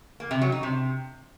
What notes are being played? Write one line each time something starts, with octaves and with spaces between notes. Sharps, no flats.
A#3
C3
F#3
D#4
C3